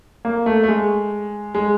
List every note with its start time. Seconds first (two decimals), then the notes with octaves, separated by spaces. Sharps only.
0.25 A#3
0.46 A3
0.63 A3
0.68 G#3
1.55 G#3